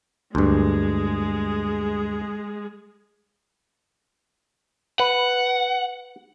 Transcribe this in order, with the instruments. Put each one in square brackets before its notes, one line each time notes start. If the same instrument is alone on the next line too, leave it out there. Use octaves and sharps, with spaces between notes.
[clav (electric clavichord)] D2 G2 [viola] G#3 G#4
[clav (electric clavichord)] B4 [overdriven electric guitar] F#5